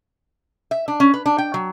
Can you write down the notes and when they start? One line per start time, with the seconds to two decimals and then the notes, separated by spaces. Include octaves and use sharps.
0.71 E5
0.88 D4
1.00 C#4
1.14 B4
1.26 D4
1.38 G5
1.54 F#3